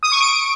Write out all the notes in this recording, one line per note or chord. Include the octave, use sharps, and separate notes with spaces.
D#6
C#6
D7